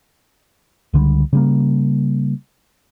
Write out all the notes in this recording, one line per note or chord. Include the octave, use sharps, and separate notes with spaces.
C#2 D3 F3 G3
C#3 G3 A#3